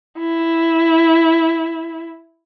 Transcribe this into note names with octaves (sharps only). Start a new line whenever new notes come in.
E4